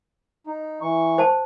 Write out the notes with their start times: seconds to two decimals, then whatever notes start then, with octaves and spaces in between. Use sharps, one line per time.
0.47 D#4
0.82 E3 C#6
1.18 C5 A5